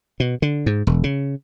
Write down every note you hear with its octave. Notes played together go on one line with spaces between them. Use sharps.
B2
D3
G#2
E1
C#3